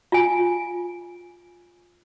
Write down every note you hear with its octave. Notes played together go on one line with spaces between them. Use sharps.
F4 G#5